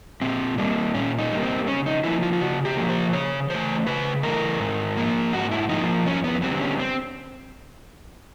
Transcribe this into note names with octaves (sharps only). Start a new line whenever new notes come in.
A#2 C4
G3 A#3
A#2 C#4
D#4
G3 A#3
C4
C#3 C#4
D#4
F3 A#3 E4
F4
F4
C#3 F#4
G4
F3 A#3
C5
C#3 C#5
E3 A3 C5
C#3 B4
E3 A3 A#4
G#2
F3 A#3
G#2 F#4
E4
F3 A#3 D#4
F2 C#4
B3
D3 G3 B3 C4
C4
C#4
C4